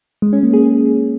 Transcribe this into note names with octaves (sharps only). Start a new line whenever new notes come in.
G#3
C#4
A#3
G#4
G#4